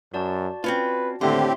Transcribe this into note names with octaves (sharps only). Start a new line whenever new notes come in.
F#2 F#4 D5 A5
C4 C#4 F4 B4
D#2 A2 D3 C4 G4 E5 C6